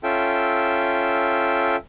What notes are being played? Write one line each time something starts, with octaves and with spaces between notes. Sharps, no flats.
C#4 F4 A4 E5 G5